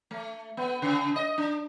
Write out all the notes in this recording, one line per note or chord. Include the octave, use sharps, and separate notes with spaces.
A3
B3
C#3
D#5
D4